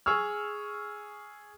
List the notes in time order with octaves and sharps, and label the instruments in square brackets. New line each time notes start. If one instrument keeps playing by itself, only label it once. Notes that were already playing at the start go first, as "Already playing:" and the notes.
[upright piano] G#4 C#6 E6 F6